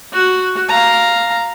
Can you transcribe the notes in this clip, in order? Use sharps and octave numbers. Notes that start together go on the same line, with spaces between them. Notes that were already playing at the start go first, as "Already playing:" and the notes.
F#4
F5 A#5